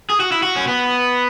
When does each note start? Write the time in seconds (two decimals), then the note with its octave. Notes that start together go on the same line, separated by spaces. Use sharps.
0.10 G#4
0.20 F#4
0.32 E4
0.43 F#4
0.56 C#4
0.67 B3